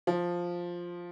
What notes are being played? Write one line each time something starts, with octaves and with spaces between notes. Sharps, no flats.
F3